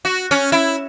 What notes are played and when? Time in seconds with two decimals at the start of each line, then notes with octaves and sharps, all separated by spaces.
0.05 F#4
0.31 C#4
0.52 E4